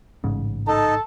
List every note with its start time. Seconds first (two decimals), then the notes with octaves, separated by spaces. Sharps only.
0.24 A1 G#2 C#3
0.68 D#4 A4 A5